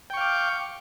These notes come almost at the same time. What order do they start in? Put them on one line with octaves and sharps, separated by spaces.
G5 C#6 F5 D6